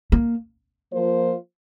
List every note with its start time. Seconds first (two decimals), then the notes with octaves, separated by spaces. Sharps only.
0.12 A#3
0.92 F3 A#3 F4 C5